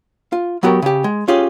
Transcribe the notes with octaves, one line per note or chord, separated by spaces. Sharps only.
F4
F#3 B3 F#4 G4 A#4
C#3 G4
G#3
C#4 F4 G4 G#4